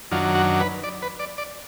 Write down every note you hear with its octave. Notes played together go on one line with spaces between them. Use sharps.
F#2 D#3 F#3 D4 F4
F#4
B4
D5
B4
D5
D5